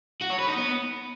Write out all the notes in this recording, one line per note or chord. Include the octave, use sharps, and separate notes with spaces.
F#4
C#5
B4
D#4
B3